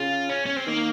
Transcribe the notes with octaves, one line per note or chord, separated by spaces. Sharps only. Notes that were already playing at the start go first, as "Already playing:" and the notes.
Already playing: C#3 F4
C#4
C#4
C4
D#3 A#3